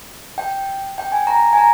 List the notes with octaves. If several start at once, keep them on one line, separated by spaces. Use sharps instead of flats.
G5
G5
G#5
A#5
G#5
A#5